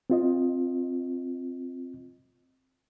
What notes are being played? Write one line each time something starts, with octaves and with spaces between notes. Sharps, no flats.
C4 F4 D#5